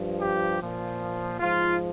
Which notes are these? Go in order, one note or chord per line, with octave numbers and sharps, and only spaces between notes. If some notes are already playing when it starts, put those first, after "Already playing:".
Already playing: G2 F3
G4
A#2 F3
G#2 F3 F4